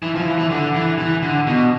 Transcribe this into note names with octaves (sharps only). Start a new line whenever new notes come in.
E3
F3
E3
E3
D3
E3
E3
D3
B2